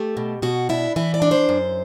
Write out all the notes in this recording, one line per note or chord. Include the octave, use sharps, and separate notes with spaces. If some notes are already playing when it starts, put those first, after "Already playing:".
Already playing: A3 G4
B2
B2 F#4
D4 E4
E3 E4
D5
D4
C5
F#2